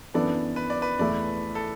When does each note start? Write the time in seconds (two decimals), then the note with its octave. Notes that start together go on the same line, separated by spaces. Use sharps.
0.14 F#2 E3 B3 D4 A4 D5
0.56 B4
0.70 D5
0.82 B4
0.99 E2 E3 A3 D5
1.55 A4